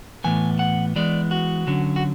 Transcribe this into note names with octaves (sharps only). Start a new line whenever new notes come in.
A2 E3 B3 G#5
F#5
E3 G#3 B3 D5
F#4
D3 F#3 C#4
F#4